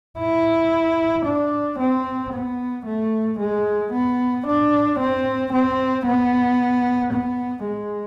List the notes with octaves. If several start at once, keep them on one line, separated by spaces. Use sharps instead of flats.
E4
D4
C4
B3
A3
G#3
B3
D4
C4
C4
B3
B3
G#3